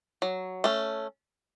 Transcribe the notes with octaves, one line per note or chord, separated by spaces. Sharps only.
F#3
A3 C#4